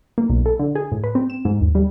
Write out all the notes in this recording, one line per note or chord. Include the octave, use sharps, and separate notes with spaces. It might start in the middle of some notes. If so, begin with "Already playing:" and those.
A#3
B1
A4
D3
G#4
A2
B4
C4
E7
G#2
D#2
G3